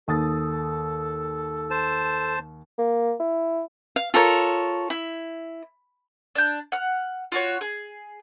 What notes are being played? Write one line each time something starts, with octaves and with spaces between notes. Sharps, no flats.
D#2 A4 D#6 A6
C5 A5
A#3
E4
F5
F4 A4 A#4 C#5
E4
D4 G6
F#5 F6
F4 F#4 C#5
G#4